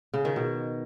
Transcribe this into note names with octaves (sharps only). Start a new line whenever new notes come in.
C#3
D#3
B2